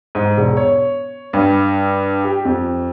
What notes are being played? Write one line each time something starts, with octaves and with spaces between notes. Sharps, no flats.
G#2
E1
C#5
G2
G4
F2